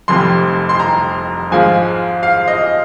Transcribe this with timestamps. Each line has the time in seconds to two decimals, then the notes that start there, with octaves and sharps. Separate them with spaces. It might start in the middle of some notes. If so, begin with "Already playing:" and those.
0.08 F1 F2 C3 C6
0.69 C6
0.80 A#5
1.51 G#2 F3 G#3 F4 G#5
2.23 F5
2.48 D#5